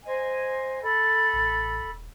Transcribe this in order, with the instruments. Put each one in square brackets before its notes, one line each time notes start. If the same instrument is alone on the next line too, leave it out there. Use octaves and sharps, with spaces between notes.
[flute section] C5 D#5 G#5
A4 B5
[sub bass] A1
D#1